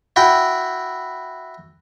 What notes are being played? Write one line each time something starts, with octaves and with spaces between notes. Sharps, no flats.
E4 F#4 G5